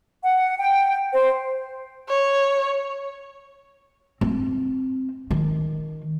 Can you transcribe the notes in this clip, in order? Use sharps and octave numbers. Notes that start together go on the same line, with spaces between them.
F#5
G5
C5
C#5
C4
D#3